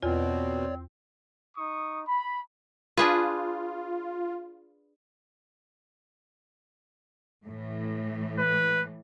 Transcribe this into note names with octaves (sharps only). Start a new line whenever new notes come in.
E2 B2 C4 F4 C#5 D5
D#4 C#6 D#6
B5
D4 F4 G#4 B4
A2 E3
B4